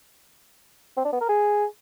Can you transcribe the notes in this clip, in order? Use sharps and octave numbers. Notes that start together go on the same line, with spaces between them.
C4
D4
B3
A#4
G#4